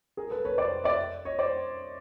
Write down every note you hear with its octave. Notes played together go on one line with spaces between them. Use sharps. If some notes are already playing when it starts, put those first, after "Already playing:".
G#4 A#4
A4 B4
B4 C#5
C5 D5
D5 E5
C#5 D#5
C5 D5